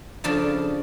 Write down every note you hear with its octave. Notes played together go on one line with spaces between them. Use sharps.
C#3 F3 D4 A4